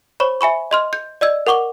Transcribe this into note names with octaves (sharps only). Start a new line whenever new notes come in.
C5 C#5 B5 C#6
E5 G#5 B5 C#6
D#5 C6 F6
G6
D5 D#5 E6 G#6
A#4 F#5 C#6 D6 G7